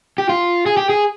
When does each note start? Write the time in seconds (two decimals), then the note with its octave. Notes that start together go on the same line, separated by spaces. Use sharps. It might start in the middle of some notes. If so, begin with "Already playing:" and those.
0.18 G4
0.29 F4
0.66 G#4
0.77 G4
0.89 G#4